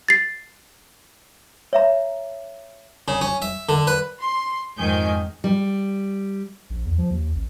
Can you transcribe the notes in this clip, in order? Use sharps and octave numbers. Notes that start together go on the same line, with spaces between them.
A6 C7
C#5 E5 A#5
C#3
C#4
E5
D3
B4
C6
F2 G#2 D#3 G#5 G6
G3
A#1
E2
F3
D#2
A1